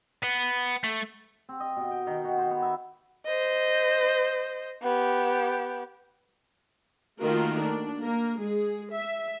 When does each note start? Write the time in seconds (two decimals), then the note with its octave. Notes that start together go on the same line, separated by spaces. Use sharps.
0.23 B3
0.84 A3
1.49 C4
1.60 D#5
1.76 B2
1.91 G5
2.07 D#3
2.24 F#4
2.38 C5
2.51 B3
2.62 E5
3.25 C5 D#5
4.82 B3 G4
7.21 D#3 A3 A#3 F4 F#4 A#4
7.60 D4
8.01 A#3 A#4
8.39 G#3 G#4
8.93 E5